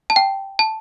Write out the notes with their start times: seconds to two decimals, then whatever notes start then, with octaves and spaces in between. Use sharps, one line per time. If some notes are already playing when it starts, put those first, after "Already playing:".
0.10 A5
0.16 G5
0.59 A5